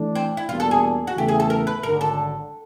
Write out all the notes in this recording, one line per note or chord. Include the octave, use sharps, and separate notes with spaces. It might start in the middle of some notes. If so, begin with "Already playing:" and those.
Already playing: E3 A3 D4
C4
E4
E2 B2 G3 A#3 D4 F4
A4
G#4
F#4
E2 C#3 E3 A3 G4
G#4
A4
A#4
B4
G#1 F#2 D3 A#4
A4